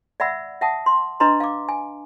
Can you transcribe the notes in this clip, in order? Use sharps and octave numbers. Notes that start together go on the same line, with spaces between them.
D5 E5 F#5 B5 E6
E5 F#5 A5 D#6
C6
D4 B4 D#5 A#5 C6
F5 D6
G#5